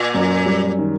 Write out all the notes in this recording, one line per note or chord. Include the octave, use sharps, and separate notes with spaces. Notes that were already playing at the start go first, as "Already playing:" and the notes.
Already playing: A#2
F#2
G3
D#3